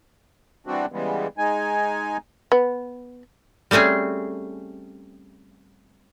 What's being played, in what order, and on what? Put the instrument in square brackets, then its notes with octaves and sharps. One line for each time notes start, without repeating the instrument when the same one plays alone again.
[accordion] E3 G3 C4 D4 F#4
C#3 E3 G3 G#3 B3
G#3 D#4 G#5
[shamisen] B3
[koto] G3 A3 C4 C#4 G#4